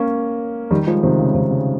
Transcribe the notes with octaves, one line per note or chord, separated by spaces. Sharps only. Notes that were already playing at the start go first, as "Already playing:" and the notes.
Already playing: A#3 C#4
D#3 G3
F3 G#3
C3 D#3
C#3
C3 D#3
C#3